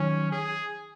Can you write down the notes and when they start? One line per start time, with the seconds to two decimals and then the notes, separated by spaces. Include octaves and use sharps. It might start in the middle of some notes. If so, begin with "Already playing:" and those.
Already playing: D#3 F#3 C#4
0.32 G#4